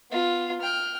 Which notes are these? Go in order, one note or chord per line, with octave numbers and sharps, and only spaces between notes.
B3 F4
G5 F6